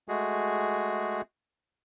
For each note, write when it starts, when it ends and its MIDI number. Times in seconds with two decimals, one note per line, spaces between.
0.09 1.22 56
0.09 1.22 57
0.09 1.22 66
0.09 1.22 68